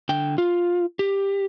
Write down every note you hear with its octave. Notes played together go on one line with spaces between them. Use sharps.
D3 G5
F4
G4